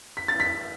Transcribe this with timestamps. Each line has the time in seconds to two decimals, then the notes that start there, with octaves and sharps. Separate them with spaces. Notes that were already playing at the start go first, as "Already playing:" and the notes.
0.17 B6
0.28 A6
0.40 B6